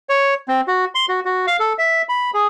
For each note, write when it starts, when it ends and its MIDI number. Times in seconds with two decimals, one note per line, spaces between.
0.09 0.34 73
0.48 0.61 60
0.68 0.85 66
0.95 1.06 84
1.09 1.20 66
1.25 1.46 66
1.47 1.57 77
1.60 1.73 69
1.78 2.02 76
2.09 2.31 83
2.34 2.47 68